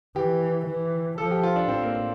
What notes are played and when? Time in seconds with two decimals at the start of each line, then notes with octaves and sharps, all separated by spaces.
0.15 E3 G4
0.66 E3
1.18 F3 A4
1.31 G4
1.43 F4
1.56 D4
1.69 A2 C4
1.82 A#3
1.95 A#3